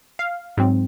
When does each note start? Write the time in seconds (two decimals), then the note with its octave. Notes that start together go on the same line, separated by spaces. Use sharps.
0.19 F5
0.57 G#2 F#3 C4